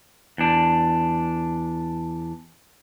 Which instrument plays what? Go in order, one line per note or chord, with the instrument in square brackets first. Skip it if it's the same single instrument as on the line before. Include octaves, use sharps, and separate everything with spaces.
[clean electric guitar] E2 D4